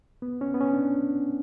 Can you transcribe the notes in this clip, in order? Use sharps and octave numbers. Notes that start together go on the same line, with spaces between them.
B3
C#4
B3
C#4
D4